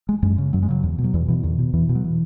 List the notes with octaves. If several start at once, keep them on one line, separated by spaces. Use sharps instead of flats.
G#3
F#2 G#3
C#3
F#2 F#3
G#3
C#3 F#3
E2
B2
F#3
E2 E3
B2 E3
E2 D#3
B2
E2 E3
B2
F#3
E3